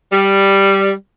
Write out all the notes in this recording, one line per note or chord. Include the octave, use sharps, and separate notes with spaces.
G3